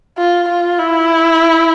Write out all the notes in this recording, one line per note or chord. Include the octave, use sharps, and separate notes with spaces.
F4
F4
E4